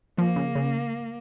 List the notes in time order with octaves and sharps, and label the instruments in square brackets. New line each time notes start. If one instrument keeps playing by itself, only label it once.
[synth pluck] F3 [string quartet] A#3
[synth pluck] C#3
C#3